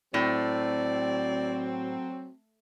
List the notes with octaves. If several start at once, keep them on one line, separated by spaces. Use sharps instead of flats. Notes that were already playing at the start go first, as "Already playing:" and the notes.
A2 F#3 C4 D5